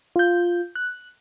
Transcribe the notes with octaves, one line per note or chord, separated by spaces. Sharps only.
F4 G6
F#6